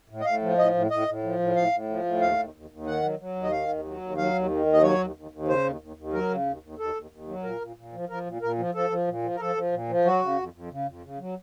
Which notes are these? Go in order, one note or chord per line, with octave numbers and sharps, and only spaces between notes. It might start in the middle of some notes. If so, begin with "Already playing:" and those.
A2
D#5
A2 F5
F3
A2 D#5
A2
A2 D#5
A2
F3
A2
A2 F5
A2
F3
A2
D#2 F5
D#2
D#2
D#2
D#3 F#5
F#3
F#3
D#2
D#5
D#3 F5
D#2
F#3
D#2
F#3 F5
D#2
D#3
D#2
D#5
F#3 C#5
D#2
D#2
D#2
C#3 C5
D#2
D#2
D#2
F#3 A#4
C#3
D#2
D#2
D#2 A4
D#2
D#2
F#3
A#2 A#4
A#2
A#2
F3
F3 A#4
A#2
A#2 A#4
F3
F3 A4
F3
A#2
F3
A#4
F3 A4
F3
A#2
F3
F#3 F#4
C#3
F2
F2
C#3
F2
C#3
F#3